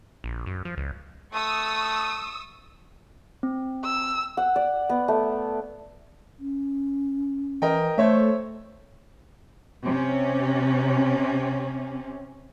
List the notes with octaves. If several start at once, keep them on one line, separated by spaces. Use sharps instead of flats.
A#1
F#2
F3
C#2
A3 C#6 D#6 E6
C4
E6
F#5
D5
B3
A3
C#4
E3 A#4 D#5 G5
A3 C5 C#5 E5
C3 C#4